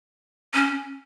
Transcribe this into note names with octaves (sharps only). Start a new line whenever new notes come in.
C#4